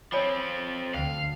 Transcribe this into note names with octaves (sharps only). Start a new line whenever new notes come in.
F3 C4 C#5 G#5 B5
D2 D3 F5 G5